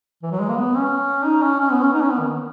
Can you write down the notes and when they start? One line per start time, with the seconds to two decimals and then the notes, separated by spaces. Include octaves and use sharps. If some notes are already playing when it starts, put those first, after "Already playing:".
0.23 E3
0.31 F#3
0.40 G#3
0.49 A#3
0.57 B3
0.75 C#4
1.26 D#4
1.43 C#4
1.60 C#4
1.71 B3
1.83 C#4
1.94 D#4
2.02 C#4
2.11 B3
2.20 D#3